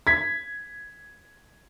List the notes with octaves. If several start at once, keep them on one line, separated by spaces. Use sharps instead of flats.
G#6 B6